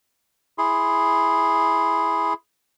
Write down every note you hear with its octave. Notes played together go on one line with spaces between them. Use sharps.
E4 G#4 C6